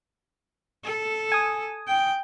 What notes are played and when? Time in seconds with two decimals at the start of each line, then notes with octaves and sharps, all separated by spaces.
0.84 A4
1.32 G#5 D#6
1.88 G5